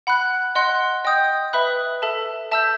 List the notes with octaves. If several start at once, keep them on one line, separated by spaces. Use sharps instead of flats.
F#5 B5 F#6
D#5 F#5 C6 F#6
D#5 G5 D#6 G6
B4 E5 B5 D#6 F#6
A4 E5 A5
E5 A5 E6 G6